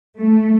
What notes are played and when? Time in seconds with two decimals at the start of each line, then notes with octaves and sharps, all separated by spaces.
0.19 A3